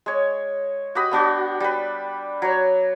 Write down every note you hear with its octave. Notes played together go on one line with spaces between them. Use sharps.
G#3 C#5
F#4 G4 D#5 B5
B3 D4 F#4 G4
G3 B4
F#3 C#5